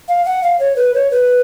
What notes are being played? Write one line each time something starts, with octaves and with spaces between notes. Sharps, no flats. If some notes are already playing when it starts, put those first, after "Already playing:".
F5
F#5
F5
C#5
B4
C#5
B4